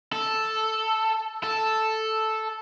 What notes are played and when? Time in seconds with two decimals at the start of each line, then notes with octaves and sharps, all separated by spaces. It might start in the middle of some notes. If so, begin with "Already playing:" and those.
0.13 A4
1.44 A4